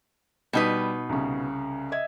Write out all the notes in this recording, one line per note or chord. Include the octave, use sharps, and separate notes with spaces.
B2 G3 D#4 B4
C2 C#3
D#5 E5 G#6